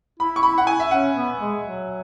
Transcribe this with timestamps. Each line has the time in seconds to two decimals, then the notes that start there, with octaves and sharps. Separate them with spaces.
0.19 E4 B5
0.36 C#6
0.43 B5
0.58 F#5
0.67 G#5
0.80 E5
0.91 C#4 F#5
1.15 B3
1.39 G#3
1.63 F#3